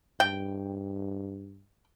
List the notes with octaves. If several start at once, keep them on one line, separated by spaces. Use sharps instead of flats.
G2 G5